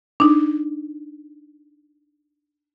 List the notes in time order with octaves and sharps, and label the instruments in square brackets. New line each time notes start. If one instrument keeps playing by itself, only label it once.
[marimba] D4 D#4